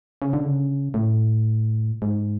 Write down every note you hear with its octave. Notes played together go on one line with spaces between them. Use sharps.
C#3
D3
C#3
A2
G#2